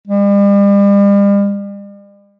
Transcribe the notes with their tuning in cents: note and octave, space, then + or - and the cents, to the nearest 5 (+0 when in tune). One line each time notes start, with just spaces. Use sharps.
G3 +40